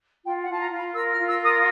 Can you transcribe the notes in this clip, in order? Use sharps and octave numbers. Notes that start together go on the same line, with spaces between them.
F4 G5
F#5
F4 A5
A#5
F4
B5
A#4 E6
F6
F4
E6
A#4 D#6